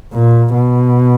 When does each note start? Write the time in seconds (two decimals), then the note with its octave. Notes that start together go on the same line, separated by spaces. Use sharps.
0.13 A#2
0.54 B2